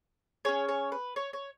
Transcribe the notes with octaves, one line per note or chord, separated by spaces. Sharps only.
C#4 G#4 C#5
C#5
B4
C#5
C#5